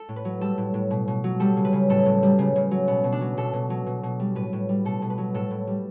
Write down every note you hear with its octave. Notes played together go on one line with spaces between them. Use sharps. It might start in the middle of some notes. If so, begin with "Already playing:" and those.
Already playing: A4
A2
B4
F#3
G3 A4
A2
A2
B2
B2
F#3
G3 A4
C#3
B4
C#3
A2 A4
A2
G3
C#3
C#3
F#3
B2 B3
B2
D4
F#3
B2 A4
B2
F#3
B2
B2
G3
A2 B4
A2
G3
B2 A4
B2
B4
F#3
A2 A4
A2
G3